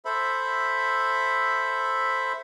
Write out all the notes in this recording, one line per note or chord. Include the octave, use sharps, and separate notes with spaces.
A4 C5 E5 B5